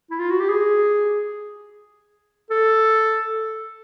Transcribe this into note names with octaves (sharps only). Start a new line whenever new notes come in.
E4
F4
F#4
G4
G#4
A4